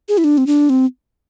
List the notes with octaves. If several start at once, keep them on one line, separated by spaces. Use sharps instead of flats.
G#4
E4
D4
C4
D4
C4